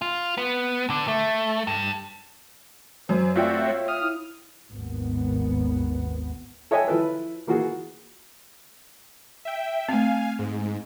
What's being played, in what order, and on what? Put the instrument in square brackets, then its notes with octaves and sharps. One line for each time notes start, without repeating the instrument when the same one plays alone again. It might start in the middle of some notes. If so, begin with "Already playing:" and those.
[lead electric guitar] F4
B3
D3
A3
G2
[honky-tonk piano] F#2 [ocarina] C5
[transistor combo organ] A3 C4 F#4 [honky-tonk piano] F4 E5 G5 [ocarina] D5
[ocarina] C#5
[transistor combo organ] D#6 F6
[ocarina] E4
[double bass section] G#1 D#2 B3
[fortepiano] A4 C#5 D#5 E5 G5 G#5
F3 E4 A4 B4
E3 A#3 F4 F#4 G#4
[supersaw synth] E5 G5
[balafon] A3 C4 [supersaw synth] F5 G#5
[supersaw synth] G#2